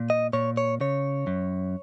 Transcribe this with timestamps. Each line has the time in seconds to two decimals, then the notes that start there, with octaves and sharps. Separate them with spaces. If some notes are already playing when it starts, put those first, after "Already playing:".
Already playing: A#2
0.10 D#5
0.33 A#2 C#5
0.57 C#5
0.81 C#3 C#5
1.27 F#2